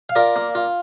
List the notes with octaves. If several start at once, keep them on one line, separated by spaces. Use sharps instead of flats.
F5
F4 A#4 D5
A#3
F4